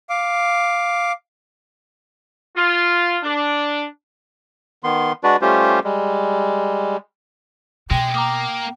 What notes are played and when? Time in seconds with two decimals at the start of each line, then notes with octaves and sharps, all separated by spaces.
0.10 F5 D6
2.56 F4
3.23 D4
4.84 D#3 B3 C6
5.24 G#3 D4 F#4 B4 D5
5.41 G3 A3 C#4 F4 G4 C5
5.84 G3 G#3
7.91 B2 G#3 G5
8.14 A#3 A#5 D6 D#6